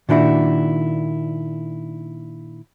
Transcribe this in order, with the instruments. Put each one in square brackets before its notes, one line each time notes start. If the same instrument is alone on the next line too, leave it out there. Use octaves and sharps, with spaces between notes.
[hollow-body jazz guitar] A#2 D#3 D4 E4 F#4